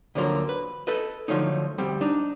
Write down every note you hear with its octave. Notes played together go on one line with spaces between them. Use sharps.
D2 D3 F3 F#3 A#3
B4
A4 B4 D#5
D3 F3 F#3 A3 D#4
D2 G3 C4
D4 D#4